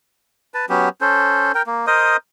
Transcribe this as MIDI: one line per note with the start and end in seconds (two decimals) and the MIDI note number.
0.54 0.66 71
0.54 0.66 81
0.69 0.89 54
0.69 0.89 59
0.69 0.89 61
0.69 0.89 67
1.01 1.52 61
1.01 1.52 69
1.01 1.52 72
1.55 1.62 70
1.55 1.62 79
1.66 1.86 58
1.87 2.17 70
1.87 2.17 72
1.87 2.17 75
1.87 2.17 87